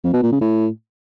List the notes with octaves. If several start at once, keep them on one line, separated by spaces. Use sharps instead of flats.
F2
B2
A#2
C#3
A2